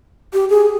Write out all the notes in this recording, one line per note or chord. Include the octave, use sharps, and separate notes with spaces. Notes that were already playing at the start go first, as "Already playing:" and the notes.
G4
G#4